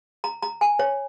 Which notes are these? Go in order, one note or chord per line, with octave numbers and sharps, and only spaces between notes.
A#5
A#5
G#5
C#5